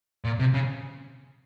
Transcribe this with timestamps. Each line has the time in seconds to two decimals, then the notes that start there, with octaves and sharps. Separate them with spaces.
0.25 A#2
0.39 C3
0.54 C#3